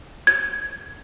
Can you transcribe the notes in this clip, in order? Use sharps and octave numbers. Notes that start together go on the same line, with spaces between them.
G#6